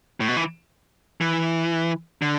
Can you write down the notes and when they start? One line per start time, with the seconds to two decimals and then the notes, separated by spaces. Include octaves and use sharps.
0.20 A2
0.28 B2
0.37 E3
1.21 E3
2.22 D3